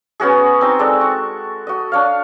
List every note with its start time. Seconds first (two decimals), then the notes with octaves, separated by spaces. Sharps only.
0.20 B3 C#4 F#4 G#4
0.61 C4 D#4 D#5
0.79 G#3 A4 D5
1.01 C#6
1.67 F#4 D#5
1.92 D4 C#5 F5